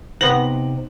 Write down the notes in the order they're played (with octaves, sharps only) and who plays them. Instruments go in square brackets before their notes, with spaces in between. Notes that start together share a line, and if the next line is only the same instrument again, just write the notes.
[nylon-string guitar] C3 D#4 C5 [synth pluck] B3 A#6 [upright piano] F#7